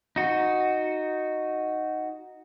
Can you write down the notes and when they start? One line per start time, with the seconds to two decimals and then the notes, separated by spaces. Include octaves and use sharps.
0.16 D#4 F#4